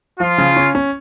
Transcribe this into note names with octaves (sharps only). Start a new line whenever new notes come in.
F3 F4
C#3
C#4
C#4